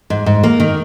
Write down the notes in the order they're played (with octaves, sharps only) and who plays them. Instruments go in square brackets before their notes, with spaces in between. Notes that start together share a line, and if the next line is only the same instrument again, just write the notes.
[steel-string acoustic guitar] G#2
G#2
A#3
D#3